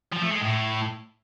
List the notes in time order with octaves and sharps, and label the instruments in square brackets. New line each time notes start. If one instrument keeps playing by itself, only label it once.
[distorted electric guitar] F3
A3
G#3
A2